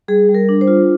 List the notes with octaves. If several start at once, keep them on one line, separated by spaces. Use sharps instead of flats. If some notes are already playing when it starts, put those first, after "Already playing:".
G3 G#4
G3
A#4
D4
C5
F4